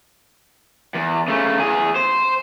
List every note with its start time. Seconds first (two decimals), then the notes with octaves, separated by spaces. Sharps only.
0.94 E2
1.28 C#3 A3
1.60 E2 G#4
1.95 C5